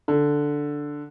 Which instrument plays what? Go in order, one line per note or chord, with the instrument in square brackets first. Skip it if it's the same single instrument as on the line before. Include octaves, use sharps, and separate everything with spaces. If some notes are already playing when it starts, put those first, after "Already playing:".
[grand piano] D3